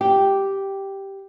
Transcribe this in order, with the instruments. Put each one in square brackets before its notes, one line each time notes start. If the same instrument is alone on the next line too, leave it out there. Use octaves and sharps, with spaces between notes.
[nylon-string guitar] G4